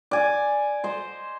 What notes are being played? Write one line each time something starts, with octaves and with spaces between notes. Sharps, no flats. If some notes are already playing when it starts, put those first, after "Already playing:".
D5 G#5
C5 D#5